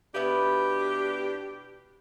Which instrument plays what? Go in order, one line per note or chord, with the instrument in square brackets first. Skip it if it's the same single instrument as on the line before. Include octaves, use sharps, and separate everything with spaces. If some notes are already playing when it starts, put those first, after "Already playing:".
[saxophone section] B2 D4 G4 [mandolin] B3 E4 B4